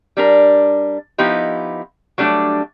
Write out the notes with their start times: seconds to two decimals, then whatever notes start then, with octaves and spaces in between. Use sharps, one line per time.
0.17 G3 D4 A#4
1.18 F3 B3 D#4 E4 G4
2.18 F#3 G3 A3 D4